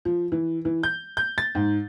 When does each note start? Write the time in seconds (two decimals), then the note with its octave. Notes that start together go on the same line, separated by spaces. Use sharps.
0.05 F3
0.32 E3
0.65 E3
0.83 G6
1.17 G6
1.38 A6
1.55 G#2